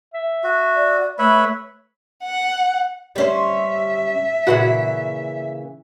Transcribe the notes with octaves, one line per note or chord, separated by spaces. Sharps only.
E5
F#4
D5
A3 B4 C#5 E5 B5
F#5
G3 C#4 C5 E5
A#2 C#3 E3 F#4 B4 F#5